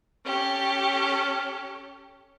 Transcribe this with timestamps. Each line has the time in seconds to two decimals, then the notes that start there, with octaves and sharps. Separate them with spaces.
0.23 C#4 G4 A4